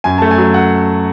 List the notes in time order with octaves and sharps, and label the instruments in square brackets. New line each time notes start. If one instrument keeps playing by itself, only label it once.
[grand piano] F#2 G#5
A3 A5
G#5
F#3
F#5